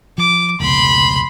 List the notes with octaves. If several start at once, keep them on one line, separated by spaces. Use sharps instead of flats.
F3 D6
F1 C#2 B2 B5 C6